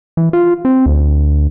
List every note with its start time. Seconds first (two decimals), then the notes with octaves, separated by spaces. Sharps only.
0.17 E3
0.33 F4
0.65 C4
0.86 D2